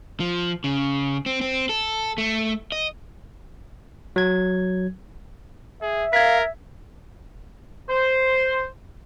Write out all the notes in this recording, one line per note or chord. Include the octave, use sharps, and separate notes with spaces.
F3
C#3
C4
C4
A4
A3
D#5
F#3 G#6
G#4 E5
A#4 F5 G#6 B6
C5